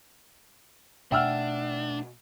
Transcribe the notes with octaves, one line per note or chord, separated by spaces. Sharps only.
B2 A3 D4 E5 F#5 G5 E6 F6